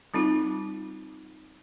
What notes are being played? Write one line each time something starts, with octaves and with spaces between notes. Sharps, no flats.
G3 C4 D#4 F4